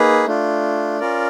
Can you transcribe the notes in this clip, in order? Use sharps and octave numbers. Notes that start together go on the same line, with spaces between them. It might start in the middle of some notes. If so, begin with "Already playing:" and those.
Already playing: A#3 D#4 G#4 B4
A3 D4 F4
C#4 F4 A#4 D5